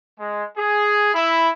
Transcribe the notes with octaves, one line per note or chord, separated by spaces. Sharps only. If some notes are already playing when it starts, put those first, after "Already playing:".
G#3
G#4
E4